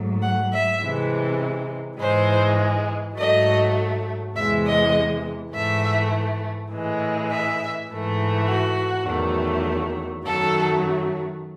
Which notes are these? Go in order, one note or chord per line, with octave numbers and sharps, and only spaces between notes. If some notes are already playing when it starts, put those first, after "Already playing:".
Already playing: G#2 F#3 A3
F#5
E5
C3 E3 G#3
G#2 E3 G#3 C5
G#2 F#3 A3 D#5
E2 C3 E3 G#3 E5
D#5
G#2 E3 A3 E5
A2 E3 G#3
E5
G#2 E3 A3
F#4
E2 D#3 F#3 A3
F#2 D#3 F#3 A3 A4